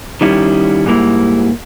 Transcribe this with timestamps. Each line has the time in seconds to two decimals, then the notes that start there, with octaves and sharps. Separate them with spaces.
0.21 D#3 G3 C#4 E4
0.86 G#2 G3 A#3 E4